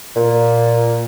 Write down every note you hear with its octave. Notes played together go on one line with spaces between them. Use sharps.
A#2